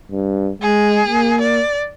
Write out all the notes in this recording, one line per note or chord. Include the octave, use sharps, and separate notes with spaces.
G2
G#3 G#4
A#3
D5